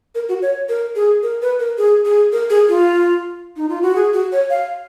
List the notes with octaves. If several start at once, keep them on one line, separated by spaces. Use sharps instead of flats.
A#4
F#4
C#5
A#4
G#4
A#4
B4
A#4
G#4
G#4
A#4
G#4
F4
D#4
F4
F#4
G#4
F#4
C#5
F5